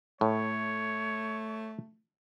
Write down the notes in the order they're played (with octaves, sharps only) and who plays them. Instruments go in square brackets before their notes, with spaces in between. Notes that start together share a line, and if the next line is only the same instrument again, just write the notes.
[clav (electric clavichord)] A2 [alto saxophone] A3 [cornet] C#5